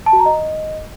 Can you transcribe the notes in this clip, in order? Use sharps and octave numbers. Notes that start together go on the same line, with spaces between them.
A5
F#4
A#5
D#5